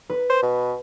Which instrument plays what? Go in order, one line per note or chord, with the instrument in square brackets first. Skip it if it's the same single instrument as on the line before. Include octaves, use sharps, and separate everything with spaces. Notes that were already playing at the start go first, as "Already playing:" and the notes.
[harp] B4
[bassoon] C5
B2